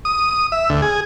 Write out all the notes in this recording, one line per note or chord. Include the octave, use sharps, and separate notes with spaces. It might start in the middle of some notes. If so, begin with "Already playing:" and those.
D#6
E5
D2
G#4